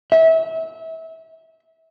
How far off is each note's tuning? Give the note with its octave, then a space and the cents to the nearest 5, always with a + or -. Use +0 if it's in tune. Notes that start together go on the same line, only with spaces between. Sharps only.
E5 -25